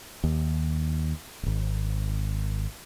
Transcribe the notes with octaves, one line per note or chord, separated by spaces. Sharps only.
D#2
D#1 G#1